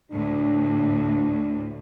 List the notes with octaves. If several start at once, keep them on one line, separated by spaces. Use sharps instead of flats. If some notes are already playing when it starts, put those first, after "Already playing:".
D2 A2 D4